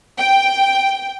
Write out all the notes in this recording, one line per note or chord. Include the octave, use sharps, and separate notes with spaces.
G5